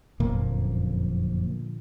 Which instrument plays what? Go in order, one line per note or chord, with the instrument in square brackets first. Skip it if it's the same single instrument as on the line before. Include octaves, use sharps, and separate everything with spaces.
[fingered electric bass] F#1 F2 A#3 [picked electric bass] A#2 D3 F3